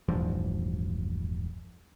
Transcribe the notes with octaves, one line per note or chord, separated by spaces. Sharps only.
E1 A1 G2 F3